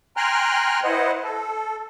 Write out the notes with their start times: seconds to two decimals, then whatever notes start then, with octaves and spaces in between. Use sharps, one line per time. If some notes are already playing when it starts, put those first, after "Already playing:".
0.17 G5 G#5 A#5 C6 F6 F#6
0.84 E4 B4 C5 D#5 F#5
1.24 A4